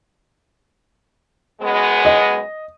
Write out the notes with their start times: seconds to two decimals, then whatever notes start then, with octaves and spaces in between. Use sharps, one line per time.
1.61 F#2 G#3 B3
2.05 D#5